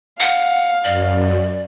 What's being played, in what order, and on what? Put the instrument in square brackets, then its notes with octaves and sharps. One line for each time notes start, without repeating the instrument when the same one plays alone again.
[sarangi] F5 [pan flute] F#5
[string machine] F#2 [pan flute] D5